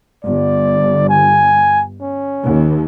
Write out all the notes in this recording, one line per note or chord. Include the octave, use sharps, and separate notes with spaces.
G1 D5
G#5
C#4
D#2